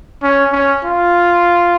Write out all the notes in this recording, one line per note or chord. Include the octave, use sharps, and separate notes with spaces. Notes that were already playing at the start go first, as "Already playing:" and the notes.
C#4
C#4
F4